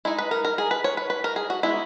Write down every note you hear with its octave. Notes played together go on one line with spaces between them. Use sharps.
G#3 D#4 E4
B4
A#4
A#4
G#4
B4
C#5
B4
B4
A#4
G#4
F#4
G#3 B3 D#4 E4